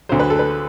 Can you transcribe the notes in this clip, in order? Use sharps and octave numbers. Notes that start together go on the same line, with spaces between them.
D2 D3 F#3 C5
B4
A4
B4